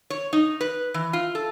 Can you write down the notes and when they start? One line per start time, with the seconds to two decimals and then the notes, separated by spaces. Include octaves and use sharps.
0.10 C#5
0.33 D#4
0.61 B4
0.94 E3
1.13 F4
1.35 A4